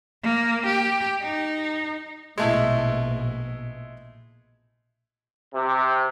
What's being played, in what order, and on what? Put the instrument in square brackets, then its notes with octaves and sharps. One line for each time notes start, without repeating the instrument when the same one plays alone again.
[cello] A#3
G4
D#4
[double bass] A#1 B2 [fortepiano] G#3 A3 E4
[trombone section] C3